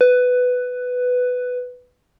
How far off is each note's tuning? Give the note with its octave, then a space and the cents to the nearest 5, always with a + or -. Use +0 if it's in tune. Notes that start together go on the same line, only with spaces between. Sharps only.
B4 +10